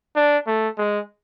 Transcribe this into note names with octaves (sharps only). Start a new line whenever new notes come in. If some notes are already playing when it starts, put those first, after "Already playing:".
D4
A3
G#3